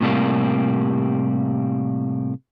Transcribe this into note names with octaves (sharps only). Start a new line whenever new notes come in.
A2 C3 G3 A#3